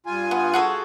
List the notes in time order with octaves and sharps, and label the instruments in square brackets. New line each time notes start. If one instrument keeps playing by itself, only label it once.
[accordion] G2 F4 G#5
[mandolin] B3
F#4 G#4 A4